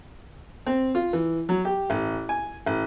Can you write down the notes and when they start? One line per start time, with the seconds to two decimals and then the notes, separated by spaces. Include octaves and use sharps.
0.66 C4
0.95 F4
1.13 E3
1.49 F#3
1.65 G4
1.90 A1
2.29 G#5
2.66 A1